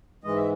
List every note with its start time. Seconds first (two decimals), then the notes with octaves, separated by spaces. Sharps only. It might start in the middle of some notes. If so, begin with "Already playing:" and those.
0.24 G#2 E3 G#3 D#5
0.36 E5